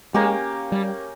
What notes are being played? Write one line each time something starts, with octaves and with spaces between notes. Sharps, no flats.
G#3 A#3 C#4 G4
G3